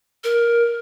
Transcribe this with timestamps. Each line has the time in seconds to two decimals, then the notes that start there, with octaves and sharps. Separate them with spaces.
0.24 A#4